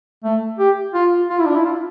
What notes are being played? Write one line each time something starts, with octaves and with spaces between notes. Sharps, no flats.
A3
G4
F4
F4
E4
D4
E4
F4